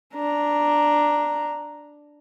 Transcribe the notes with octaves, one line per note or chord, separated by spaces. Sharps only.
D4 A#5